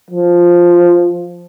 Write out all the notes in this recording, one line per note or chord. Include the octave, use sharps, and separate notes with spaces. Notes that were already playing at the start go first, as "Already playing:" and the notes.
F3